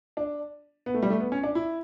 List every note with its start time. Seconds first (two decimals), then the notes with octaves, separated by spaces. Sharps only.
0.17 D4
0.86 B3
0.94 A3
1.02 G3
1.10 A3
1.20 B3
1.32 C#4
1.43 D4
1.55 E4